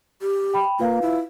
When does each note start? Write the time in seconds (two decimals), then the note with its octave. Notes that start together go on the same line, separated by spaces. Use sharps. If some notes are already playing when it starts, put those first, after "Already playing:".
0.22 G4
0.54 G5 B5
0.79 A#3 F4 B4 F5
1.02 E4